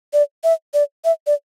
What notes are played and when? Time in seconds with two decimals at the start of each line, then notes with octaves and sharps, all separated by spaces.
0.13 D5
0.44 E5
0.74 D5
1.05 E5
1.27 D5